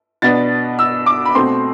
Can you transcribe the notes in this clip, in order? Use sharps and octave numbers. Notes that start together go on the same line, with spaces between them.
B2 B3 D4 A6
E6
D6
B5
B2 A3 C4 C6